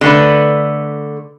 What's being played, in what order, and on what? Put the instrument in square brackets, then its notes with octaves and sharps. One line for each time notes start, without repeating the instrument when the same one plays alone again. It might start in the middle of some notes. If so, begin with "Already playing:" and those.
[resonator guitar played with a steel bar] D3 A3 B4